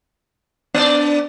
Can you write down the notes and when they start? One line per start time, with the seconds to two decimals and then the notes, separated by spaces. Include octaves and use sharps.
0.74 B3 D4 D5